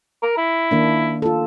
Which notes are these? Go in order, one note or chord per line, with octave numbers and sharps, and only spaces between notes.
A#4
E4
D#3 A#3 D4
F4 A4